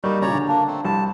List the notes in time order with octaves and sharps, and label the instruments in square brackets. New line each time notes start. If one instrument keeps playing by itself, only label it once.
[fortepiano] G3 A#3 [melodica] D#4 F#4
[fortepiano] A#2 C#3 [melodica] C#5 D5 A#5
[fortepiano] D3
[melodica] A#3 D4
A3 C4
[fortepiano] C2 [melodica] A5